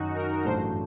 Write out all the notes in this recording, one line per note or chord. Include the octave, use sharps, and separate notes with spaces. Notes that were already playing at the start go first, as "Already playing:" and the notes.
Already playing: F#2 D#3 F#3 D#4 F#4
A#4
A1 G2 F#3 A3 D4 C5